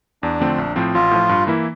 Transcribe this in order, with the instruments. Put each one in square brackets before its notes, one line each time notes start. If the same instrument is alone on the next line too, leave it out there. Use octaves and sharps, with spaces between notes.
[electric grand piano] E2 [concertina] D4
[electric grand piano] D3 F3 A3 C4
A#1
A2 F3 C4
[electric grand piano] A1 [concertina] F4
[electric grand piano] A2 F3
G2
E3 A#3 E4